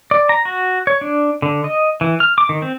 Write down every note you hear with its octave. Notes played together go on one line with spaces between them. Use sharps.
D5
A#5
F#4
C#5
D4
D3
D#5
E3
F6
D6
D#3
C4